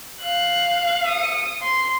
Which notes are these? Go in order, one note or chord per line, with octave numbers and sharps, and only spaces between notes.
F5 F#6
D#6 C#7
C6